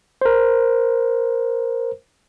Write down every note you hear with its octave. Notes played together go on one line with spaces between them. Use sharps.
A#4 C5